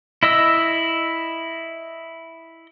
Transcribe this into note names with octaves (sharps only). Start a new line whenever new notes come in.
E4 D#5 E6